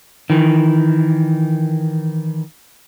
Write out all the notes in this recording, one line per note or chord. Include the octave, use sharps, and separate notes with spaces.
D#3 E3